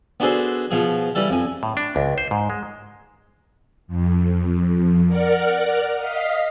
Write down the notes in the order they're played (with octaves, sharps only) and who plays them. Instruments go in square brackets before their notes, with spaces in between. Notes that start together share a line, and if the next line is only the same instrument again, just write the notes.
[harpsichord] B3 D4 F#4 G#4 A4 C5
B2 F3 G#4
E3 G3 A4
F2 G#5
[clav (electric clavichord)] A2
D4
C#2
C5
G#2
G#3
[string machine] F2
A#4 D5 F#5 F6
D#5 F5 B6